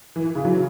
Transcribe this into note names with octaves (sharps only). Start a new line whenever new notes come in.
E3
E3
C#3
F#3